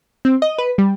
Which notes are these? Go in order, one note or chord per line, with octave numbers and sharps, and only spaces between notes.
C4
D#5
B4
G3